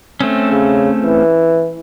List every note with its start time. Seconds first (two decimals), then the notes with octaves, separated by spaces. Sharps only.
0.20 A3 C4 C#4
0.51 C#3
1.03 E3